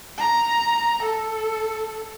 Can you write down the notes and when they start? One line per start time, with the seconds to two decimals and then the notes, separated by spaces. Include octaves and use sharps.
0.18 A#5
1.03 A4